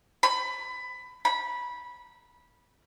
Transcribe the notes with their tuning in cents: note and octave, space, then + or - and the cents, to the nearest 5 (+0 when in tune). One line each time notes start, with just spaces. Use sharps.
B5 +20
B5 -15